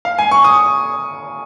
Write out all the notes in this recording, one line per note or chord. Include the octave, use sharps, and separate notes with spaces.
F5
G#5
C#6
D#6